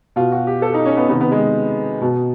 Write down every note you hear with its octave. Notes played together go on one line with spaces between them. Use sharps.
B2 F4
F#4
G4
A4
D#4
C#4
B3
C3 D#3 B3
B3
G#3
B2